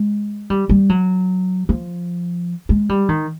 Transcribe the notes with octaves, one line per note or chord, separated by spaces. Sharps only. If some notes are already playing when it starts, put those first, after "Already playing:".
Already playing: G#3
G3
G3
F#3
F3
G#3
G3
D#3